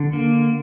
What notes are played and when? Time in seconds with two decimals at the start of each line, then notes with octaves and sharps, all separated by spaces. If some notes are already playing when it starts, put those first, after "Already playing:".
Already playing: D3
0.13 A#3